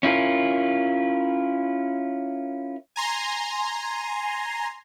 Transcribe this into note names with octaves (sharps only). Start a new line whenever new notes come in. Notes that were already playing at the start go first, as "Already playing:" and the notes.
C#4 E4 F4 A#4
G#5 A#5 C6